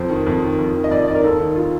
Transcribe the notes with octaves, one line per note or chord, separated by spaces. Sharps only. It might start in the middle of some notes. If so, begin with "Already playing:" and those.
Already playing: F2 C5
D#3
F2
D#3
F2
D#3
D#5
F2 D5
D#5
D#3 D5
A#4
D#2 A4
D#3
F4